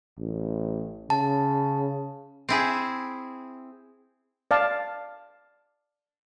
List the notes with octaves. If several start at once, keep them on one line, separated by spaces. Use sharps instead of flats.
A1
C#3 A5
C4 E4 G#4
D5 F5 A5